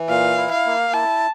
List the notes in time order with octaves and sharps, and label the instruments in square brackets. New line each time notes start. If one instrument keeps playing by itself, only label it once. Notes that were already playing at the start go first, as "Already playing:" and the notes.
Already playing: [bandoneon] E3
[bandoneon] A#2 [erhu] F5
[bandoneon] E4
[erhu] F5
[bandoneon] A#3
[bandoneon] E4 [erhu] A5